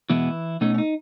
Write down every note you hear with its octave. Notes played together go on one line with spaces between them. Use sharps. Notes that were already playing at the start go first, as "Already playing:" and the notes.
E2 B2 E3 G#3 B3 E4
B2 A3 C#4 D#4
C#4
D#4